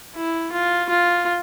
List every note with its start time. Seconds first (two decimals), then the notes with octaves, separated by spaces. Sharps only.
0.15 E4
0.52 F4
0.89 F4